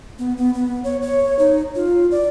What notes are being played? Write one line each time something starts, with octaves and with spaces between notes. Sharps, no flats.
B3
B3
B3
C#5
C#5
D#4
F4
D5